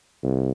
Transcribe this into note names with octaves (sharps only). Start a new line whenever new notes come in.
C2